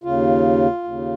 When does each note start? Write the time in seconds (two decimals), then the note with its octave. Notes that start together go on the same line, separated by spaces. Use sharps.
0.04 D#2 C#3 F4
0.84 D#2 C#3